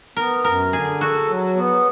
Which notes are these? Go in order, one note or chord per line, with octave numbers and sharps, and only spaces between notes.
B3 A#4
F#2 A#4
D3 G#4
F#4 A4
F#3
B3